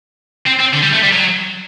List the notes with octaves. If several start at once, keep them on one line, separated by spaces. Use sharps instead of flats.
C4
C4
D3
G3
A3
G3
F#3